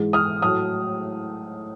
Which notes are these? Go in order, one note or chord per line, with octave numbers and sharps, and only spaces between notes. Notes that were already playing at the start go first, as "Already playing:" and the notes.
Already playing: G#2 E3 G#3
D#6 F6
A2 F#3 A3 D#6 F6